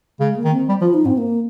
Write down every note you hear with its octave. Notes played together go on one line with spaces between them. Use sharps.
C#3 G#3
A#3
D#3
C4
G3
F3 F4
D#4
G#2 C4
A#3